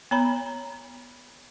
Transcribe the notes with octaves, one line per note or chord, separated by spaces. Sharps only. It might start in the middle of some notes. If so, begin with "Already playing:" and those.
B3 C#5 A#5 B5